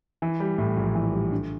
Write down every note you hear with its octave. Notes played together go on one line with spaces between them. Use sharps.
E3
G3
A2
A#1
E3
G3
D3